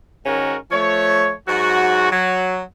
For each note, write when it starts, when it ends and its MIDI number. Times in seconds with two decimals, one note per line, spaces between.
0.26 0.56 44
0.26 0.56 51
0.26 0.56 61
0.26 0.56 66
0.26 0.56 70
0.71 1.33 53
0.71 1.33 57
0.71 1.33 73
1.47 2.09 44
1.47 2.09 54
1.47 2.09 66
2.11 2.62 54